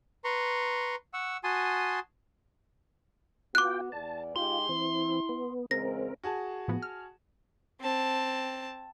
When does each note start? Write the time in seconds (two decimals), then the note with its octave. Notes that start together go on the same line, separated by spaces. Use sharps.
0.24 B4 A#5 C6 C#6
1.14 F#5 C#6 E6
1.44 F#4 G#5 A5 C6 D#6
3.55 B3 F4 F#4 G5 D6 F#6
3.92 E2 D5 A5
4.36 G#3 D#4 F4 G4 C6
4.69 E3 C4 E4
5.29 B3
5.71 E2 C#3 G#3 C4 A#4 A#6
6.24 F#4 G#4 A5
6.68 A2 F3 B3
6.82 F6
7.81 C4 A5